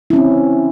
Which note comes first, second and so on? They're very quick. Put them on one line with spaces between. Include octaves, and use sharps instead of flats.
E4 C#4 C4